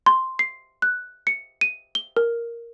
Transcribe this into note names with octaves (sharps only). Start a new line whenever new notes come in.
C6
C7
F#6
C#7
D#7
G7
A#4